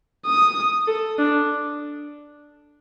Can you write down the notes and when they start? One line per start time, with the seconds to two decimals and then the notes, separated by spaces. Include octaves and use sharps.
0.26 D#6
0.87 A4
1.18 D4